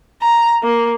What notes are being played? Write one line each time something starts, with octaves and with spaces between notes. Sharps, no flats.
A#5
A#3